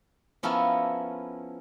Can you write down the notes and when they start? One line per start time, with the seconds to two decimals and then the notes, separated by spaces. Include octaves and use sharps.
0.43 F3 B3 C#4 E4 A4 A#4